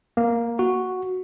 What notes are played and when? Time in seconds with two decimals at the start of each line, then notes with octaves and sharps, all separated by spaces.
0.17 A#3
0.59 F#4